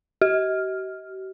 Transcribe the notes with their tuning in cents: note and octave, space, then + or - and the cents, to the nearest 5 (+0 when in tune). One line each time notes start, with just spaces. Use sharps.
G4 -45